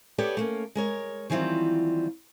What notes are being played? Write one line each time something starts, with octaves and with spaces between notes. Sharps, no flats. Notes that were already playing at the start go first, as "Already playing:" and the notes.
B3 G4 A4 B4 C#5 D5
A3 A#3 C#4
G#3 A#4 C#5
D#3 E3 F#3 G3 C4 F4